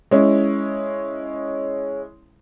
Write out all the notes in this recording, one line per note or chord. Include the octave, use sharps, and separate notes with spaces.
G#3 C#4 E4